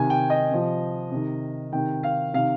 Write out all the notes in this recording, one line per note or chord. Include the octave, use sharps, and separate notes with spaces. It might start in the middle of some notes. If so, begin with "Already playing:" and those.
Already playing: C3 D#3 G#5
G5
D#5
C3 F3
C3 D#3
C3 D#3 G5
F5
C3 D#3 F5